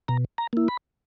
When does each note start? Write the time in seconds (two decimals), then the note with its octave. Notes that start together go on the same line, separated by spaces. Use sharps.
0.08 B2 A#5
0.38 A#5
0.53 A#3 E4
0.68 B5